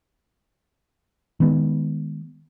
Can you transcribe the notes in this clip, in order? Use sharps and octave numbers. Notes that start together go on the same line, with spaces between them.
D#3 G#3 B3